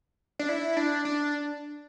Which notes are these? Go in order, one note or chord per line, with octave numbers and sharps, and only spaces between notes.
D4
E4
D4
D4